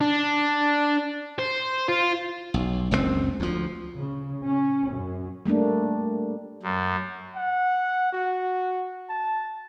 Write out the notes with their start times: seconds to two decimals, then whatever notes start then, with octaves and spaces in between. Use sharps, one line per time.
0.01 D4
1.39 C5
1.88 F4
2.54 B1
2.91 F#1 C#2 B2 C4
3.40 D2 F3
3.96 C#3
4.46 C#4
4.92 F#2
5.45 G3 A3 A#3 D4
6.63 F#2
7.36 F#5
8.13 F#4
9.09 A5